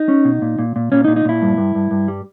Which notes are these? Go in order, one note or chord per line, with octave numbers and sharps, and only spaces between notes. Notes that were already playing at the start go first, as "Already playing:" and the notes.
Already playing: D#4
C#4
B2
A#2
A#2
A#2
A#2 C#4
D#4
A#2
D#4
A#2 E4
G2
G2
G2
G2
G3